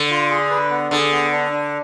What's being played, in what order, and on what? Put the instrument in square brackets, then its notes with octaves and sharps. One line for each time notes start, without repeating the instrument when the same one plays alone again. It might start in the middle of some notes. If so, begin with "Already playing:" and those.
Already playing: [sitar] D3
[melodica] F4
G#4
B4
B3
[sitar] D3 [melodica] G#4
[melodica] B3
D4
D4